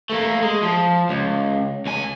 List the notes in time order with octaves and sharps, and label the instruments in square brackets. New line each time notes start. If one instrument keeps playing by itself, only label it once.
[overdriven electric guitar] A3 A#3
G#3
F3
C#2
C#2 G#5